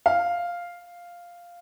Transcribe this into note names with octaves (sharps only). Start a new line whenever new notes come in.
F5